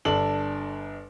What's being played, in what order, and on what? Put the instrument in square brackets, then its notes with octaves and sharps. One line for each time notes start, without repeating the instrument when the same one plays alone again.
[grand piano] G1 D4 A4 F#7